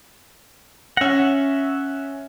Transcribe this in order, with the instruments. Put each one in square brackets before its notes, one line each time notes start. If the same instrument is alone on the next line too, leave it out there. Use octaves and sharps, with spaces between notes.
[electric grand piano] C#4 A#6 [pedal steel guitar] E5 F#5